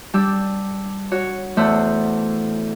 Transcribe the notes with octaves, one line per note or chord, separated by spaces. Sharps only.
G3 D4 G4 E6
F#4 C#5
E2 A2 A3 C5 F#5 E6